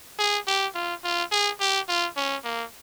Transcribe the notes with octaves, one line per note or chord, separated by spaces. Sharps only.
G#4
G4
F4
F4
G#4
G4
F4
C#4
A#3